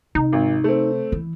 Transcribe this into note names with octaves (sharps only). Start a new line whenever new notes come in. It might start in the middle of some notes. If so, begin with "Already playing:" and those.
C3 D#4
G#1
A3 C4
E3